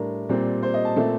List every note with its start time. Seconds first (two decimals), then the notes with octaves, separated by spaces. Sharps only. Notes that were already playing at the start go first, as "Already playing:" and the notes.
Already playing: A2 G3 D4 A#4
0.29 A#2 G3 C4
0.63 C5
0.74 D#5
0.85 A5
0.96 A#2 A3 C4